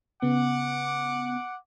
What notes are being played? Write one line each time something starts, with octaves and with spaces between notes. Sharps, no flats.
C#3 B3 F#5 D6